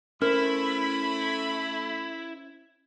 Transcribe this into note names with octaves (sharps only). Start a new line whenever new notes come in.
A3 C#4 E4 A#4 C5 B5